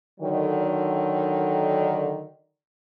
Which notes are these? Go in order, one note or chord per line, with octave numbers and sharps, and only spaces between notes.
D3 D#3 F#3